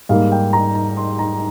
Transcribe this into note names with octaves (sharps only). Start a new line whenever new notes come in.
G#2 G3 A#3 F5
G5
A#5
A#5
C6
A#5